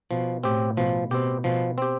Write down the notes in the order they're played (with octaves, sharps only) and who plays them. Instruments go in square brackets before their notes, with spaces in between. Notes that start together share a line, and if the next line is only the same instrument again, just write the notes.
[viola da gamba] B2 [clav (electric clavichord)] F3
[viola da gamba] A2 [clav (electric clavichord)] C4 G4
[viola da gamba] B2 [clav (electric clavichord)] F3
[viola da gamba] B2 [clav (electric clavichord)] C4 G4
[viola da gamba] B2 [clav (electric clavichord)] F3
[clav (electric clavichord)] C4 G4